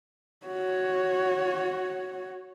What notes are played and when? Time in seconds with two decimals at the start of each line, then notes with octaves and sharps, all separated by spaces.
0.46 F#4 C#5